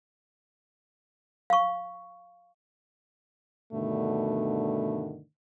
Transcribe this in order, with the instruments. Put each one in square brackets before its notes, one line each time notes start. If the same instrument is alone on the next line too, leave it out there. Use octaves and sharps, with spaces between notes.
[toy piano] F5 C#6
[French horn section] G2 B2 D3 D#3 A3